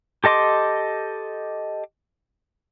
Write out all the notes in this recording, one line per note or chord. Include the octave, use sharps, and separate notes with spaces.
G4 A4 D#5 C6 D6